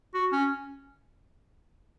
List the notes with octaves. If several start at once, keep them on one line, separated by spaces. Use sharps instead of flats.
F#4
C#4